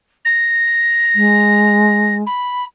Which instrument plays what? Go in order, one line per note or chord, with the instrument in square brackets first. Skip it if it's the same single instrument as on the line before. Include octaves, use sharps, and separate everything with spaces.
[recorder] A#6
[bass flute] G#3
[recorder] B5